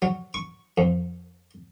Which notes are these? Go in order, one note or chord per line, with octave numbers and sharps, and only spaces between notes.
F#3
C#6
F2